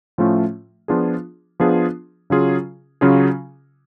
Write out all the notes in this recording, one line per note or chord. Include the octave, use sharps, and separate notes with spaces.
A2 F3 A3 C#4 F4
F3 B3 D4 F4 G#4
F3 B3 D4 F4 G#4
C#3 F#3 C#4 F4 G#4
C#3 F#3 C#4 F4 G#4